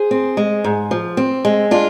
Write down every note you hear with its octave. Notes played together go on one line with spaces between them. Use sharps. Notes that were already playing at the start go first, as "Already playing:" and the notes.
Already playing: G#4 C5
C4
G#3
G#2
F3
C4
G#3
D4 F4